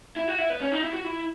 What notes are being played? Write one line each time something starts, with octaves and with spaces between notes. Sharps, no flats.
E4
F#4
E4
B3
C#4
D#4
E4
F#4
E4